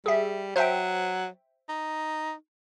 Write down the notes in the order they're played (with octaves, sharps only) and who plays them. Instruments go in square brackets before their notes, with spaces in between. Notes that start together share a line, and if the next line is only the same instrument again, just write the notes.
[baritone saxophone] G3 [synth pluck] G#4 E5
[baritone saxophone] F#3 [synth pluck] C5 E5 G5
[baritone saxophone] D#4